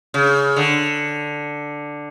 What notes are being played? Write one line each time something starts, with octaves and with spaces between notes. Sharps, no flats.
C#3
D3